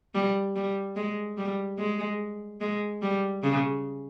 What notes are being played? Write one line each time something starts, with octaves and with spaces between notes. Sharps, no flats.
G3
G3
G#3
G3
G#3
G#3
G3
C#3